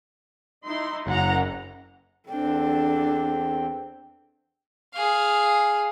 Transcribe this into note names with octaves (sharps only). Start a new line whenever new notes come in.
D#4 E4 C6
F#1 F#5 A#5
E2 C4 D4 A4 G5
G#4 F5